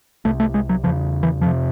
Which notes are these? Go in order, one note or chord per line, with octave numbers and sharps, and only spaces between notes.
C2 C3 A3
A3
G#3
F#3
E2 C#3 F3
E3
F2 C3 F3